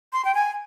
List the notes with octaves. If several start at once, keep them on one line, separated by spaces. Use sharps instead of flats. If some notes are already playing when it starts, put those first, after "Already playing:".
C6
G5
G#5